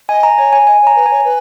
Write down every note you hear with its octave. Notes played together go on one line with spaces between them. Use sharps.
D#5 G#5
A#5
C#5 G#5
G#5
D#5 G#5
C#5
A#5
B4
G#5
C#5
B4